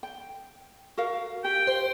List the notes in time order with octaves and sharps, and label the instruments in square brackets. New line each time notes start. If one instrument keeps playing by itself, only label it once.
[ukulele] G5
F#4 A#4 F5
[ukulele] G4 [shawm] G5
[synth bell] C5